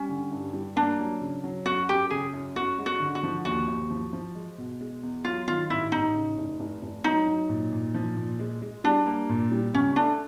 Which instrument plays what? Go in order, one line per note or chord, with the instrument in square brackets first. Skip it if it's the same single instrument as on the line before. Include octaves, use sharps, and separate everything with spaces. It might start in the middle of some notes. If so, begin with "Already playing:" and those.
Already playing: [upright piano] G3 [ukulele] C#4
[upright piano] D3
G2
G3
[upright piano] A#3 [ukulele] D4
[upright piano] F#3
C#3
F#3
[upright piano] F#2 [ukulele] F#4
[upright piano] F#2 [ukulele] G4
[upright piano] C#3 [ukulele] G#4
[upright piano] F#2
[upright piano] F#2 [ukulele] F#4
[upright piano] G#3
[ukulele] F#4
[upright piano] D3
[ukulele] F#4
[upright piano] F3
[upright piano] D#2 [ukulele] F#4
[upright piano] D#2
F3
F3
G#3
B2
G#3
E2
[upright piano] F#3 [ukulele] F4
[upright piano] D#3 [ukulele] F4
[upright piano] A1 [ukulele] E4
[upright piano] A1 [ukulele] D#4
[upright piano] C#3
F1
F1
F1
[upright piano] F#3 [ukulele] D#4
[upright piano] F#3
A#2
A#2
F3
A#2
G#3
G#3
[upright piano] G3 [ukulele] D4
[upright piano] A#3
A#2
G3
[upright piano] C#2 [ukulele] C#4
[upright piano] A3 [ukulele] D4